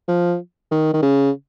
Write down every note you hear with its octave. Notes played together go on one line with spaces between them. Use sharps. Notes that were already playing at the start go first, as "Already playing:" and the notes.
F3
D#3
D#3
C#3